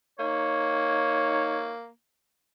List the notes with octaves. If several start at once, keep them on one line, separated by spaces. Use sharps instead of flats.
A#3 D#4 C#5